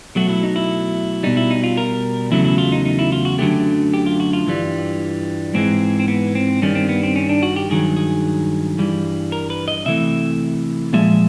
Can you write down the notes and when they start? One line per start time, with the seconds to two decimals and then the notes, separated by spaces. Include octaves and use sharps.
0.15 B2 F#3 A3 F#4
0.29 E4
0.43 D#4
0.56 E4
1.23 B2 G3 D#4
1.37 E4
1.51 D#4
1.64 F4
1.77 A#4
2.31 E2 C#3 F#3 A3 E4
2.45 E4
2.58 F4
2.72 D#4
2.85 D#4
2.99 E4
3.12 F4
3.25 F#4
3.39 F#2 D3 F#3 A3 G4
3.94 G4
4.06 F4
4.20 F#4
4.33 F4
4.47 G2 E3 G3
5.54 G#2 E3 G#3 C4
5.99 C4
6.08 B3
6.35 C4
6.62 G2 D#3 G3 C#4
6.75 C4
6.89 B3
7.03 C4
7.16 C#4
7.29 D4
7.43 F#4
7.56 G4
7.70 G2 D#3 F#3 G#4
7.96 G#4
8.78 G2 E3 G3
9.32 A#4
9.50 B4
9.68 D#5
9.86 C3 E3 A3 E5
10.93 A#2 F3 G#3 E5